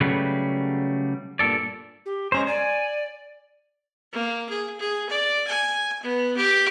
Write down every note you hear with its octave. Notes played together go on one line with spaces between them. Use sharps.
C#3 F#3 G3 A3 B4
G2 A#2 D#3 A4 D5
G4
G#3 C#4 C5 A#5
D5 G#5
A#3
G#4
G#4
D5
G#5
B3
G4